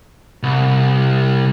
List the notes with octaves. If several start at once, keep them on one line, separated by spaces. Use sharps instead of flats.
C2